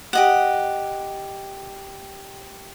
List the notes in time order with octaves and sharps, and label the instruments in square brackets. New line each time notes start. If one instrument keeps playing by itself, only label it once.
[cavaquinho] G4 D#5 F#5